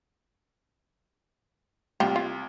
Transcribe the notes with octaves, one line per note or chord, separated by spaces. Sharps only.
C2 F4 G4
F4